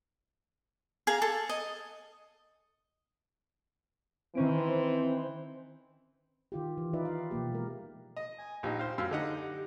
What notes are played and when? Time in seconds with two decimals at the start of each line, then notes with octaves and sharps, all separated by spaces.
1.07 G#4 F5 A#5
1.22 A4
1.49 D#5
4.35 D#3 E3 C4 C#4 C5 D7
6.52 D#3 F4 G4
6.77 E3
6.93 D#4 F4 B4 D5 E5
7.05 F5
7.31 B2 F3 A#3 G4
7.53 G#3 A#4
8.16 D#5
8.38 G#5
8.63 A#1 D#4 G4
8.79 C5 F5
8.98 F#2 F5 E6
9.11 D3 D#4 F#5